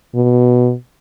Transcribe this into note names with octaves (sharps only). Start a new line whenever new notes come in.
B2